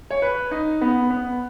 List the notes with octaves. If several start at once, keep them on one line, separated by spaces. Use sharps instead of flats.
C#5
B4
D#4
B3
B3